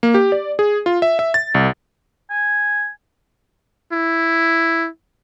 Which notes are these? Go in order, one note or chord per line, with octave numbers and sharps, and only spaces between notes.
A#3
G4
D5
G#4
F4
E5
E5
A6
C2
G#5
E4